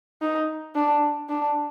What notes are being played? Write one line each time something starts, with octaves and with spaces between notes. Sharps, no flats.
D#4
D4
D4